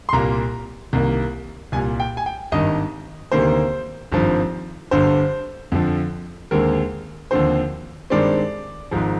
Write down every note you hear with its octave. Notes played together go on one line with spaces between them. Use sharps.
C6
C2 A#2 G3 A#3 A#5
C2 C3 D#3 A#3
C2 A#2 G3 G#5
G5
G#5
G5
G#1 G2 D#3 D#5
D2 C3 D#3 A#3 C5
G#1 G2 F3 C4
G1 G2 D3 C5
F2 D3 F3
D#2 D3 G#3 C4 A#4
D#2 D3 F3 C4 C5
G2 D#3 G#3 C4 D5
G#1 G#2 F3